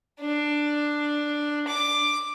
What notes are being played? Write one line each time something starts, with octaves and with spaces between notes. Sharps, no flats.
D4
D6